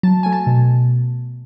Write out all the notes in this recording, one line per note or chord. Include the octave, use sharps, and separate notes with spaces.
F#3 A5
A3 G#5
A5
B2